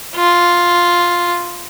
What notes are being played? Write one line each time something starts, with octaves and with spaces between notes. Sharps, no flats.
F4